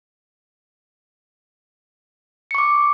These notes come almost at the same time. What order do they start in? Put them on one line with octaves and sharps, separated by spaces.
C#7 C#6 D6